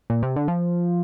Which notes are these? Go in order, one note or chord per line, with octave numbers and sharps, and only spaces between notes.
A#2
C3
D3
F3